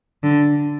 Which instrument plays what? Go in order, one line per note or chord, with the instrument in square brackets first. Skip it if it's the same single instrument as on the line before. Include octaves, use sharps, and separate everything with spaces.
[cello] D3